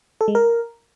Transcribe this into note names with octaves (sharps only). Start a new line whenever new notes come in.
A4
G#3
A#4